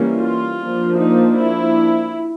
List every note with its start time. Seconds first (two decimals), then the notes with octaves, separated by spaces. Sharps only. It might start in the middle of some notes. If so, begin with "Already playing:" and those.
Already playing: E3 G3 A#3 C#4
0.19 F4
0.60 F3 A#3 D4
0.99 D#4
1.39 E4